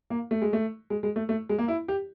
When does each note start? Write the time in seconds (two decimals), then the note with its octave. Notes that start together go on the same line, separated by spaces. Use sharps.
0.10 A#3
0.31 A3
0.42 G#3
0.53 A3
0.90 G#3
1.03 G#3
1.16 A3
1.29 A3
1.49 G#3
1.58 A#3
1.68 E4
1.88 G4